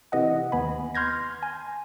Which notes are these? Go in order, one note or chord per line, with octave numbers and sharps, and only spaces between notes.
C3 E3 D#5 F#5
D#2 B3 G#5 B5
C6 F6 G6 G#6 A#6
G#5